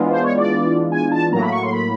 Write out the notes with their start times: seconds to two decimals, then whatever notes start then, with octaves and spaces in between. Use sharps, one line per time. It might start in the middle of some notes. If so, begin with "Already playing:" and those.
Already playing: E3 G#3 B3 D4 F4
0.11 C5
0.23 C#5
0.38 D5
0.92 G#5
1.12 A5
1.32 A2 F#3 A#3 A#5
1.42 B5
1.52 C#6
1.63 C6
1.73 B5